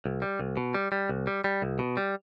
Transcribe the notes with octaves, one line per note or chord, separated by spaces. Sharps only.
C2
G3
C2
B2
G3
G3
C2
G3
G3
C2
B2
G3